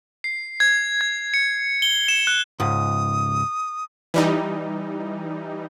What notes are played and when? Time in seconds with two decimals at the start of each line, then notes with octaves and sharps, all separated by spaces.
0.24 C7
0.60 G#6
1.01 G#6
1.34 C#7
1.82 G7
2.08 E7
2.27 F#6
2.60 C#2 G#2 D#6
4.14 E3 G3 D#4